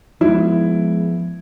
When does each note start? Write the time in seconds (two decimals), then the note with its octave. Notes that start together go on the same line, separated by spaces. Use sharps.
0.21 F3 G#3 B3 E4